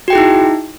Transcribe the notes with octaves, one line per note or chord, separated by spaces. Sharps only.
D#4 E4 F#4 G#4 G5